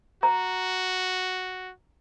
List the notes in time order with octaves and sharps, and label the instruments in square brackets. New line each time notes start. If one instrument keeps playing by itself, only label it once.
[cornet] F#4 [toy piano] A#5